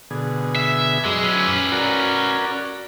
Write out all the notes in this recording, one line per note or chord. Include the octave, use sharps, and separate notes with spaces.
B2 D3 G#4
E5
F#2 G#3 D6 E6
C#4 B4
F#4 A#4 D5